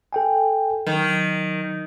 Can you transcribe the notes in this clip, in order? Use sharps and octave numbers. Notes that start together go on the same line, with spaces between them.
A4 G5 G#5
D#3 F#3